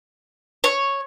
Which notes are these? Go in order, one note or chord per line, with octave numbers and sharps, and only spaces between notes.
C#5